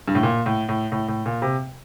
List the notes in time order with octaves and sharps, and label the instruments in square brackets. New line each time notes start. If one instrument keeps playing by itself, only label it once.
[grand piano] G2
A2
A#2
A2
A2
A2
A2
A#2
C3